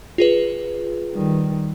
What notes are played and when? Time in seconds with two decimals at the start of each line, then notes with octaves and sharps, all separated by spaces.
0.18 F4 G#4 B4
1.12 D#3 G3